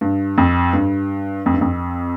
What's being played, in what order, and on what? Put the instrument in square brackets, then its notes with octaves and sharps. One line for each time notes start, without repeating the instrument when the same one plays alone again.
[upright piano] G2
F2
G2
F2
G2
F2